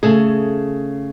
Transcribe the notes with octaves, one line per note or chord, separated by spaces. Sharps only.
C#3 A3 G#4